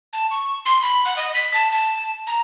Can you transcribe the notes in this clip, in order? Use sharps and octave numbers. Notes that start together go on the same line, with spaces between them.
A5
C#6
C6
B5
F#5
D#5
B6
A5
A5
A#5